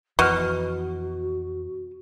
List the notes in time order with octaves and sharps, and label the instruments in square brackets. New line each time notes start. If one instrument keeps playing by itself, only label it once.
[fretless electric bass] F2 E3 [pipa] B2 [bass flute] F#4 [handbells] C#6 F6